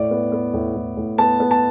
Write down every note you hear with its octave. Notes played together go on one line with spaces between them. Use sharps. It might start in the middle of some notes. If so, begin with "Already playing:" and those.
Already playing: A2 D5
B3
B3
A2
A2
A2
B3 A5
B3
A5